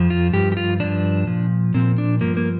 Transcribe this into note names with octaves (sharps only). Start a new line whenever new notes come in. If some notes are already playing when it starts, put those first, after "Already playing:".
Already playing: F2 F3
F4
G2 F3 G4
G4
F4
G2 F3 D4
A#2 F3
A#2 F3 C4
D4
G2 F3 A#3
A#3